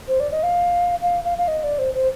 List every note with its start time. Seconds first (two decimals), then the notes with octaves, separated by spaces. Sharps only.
0.08 C5
0.20 D5
0.32 D#5
0.43 F5
1.02 F5
1.25 F5
1.38 F5
1.48 D#5
1.64 D5
1.79 C5
1.94 C5